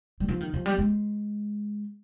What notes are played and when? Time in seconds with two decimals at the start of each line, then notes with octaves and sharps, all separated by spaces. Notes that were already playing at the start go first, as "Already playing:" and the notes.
0.20 G3
0.29 F3
0.41 D#3
0.54 F3
0.66 G3
0.79 G#3